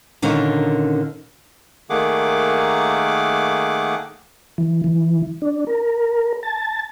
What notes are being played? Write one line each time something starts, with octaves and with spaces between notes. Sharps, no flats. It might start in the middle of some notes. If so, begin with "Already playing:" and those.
A#2 D3 D#3 C#4
D#3 A3 A#3 G#4 F#5 D6
E3
E3
D4
A#4
A5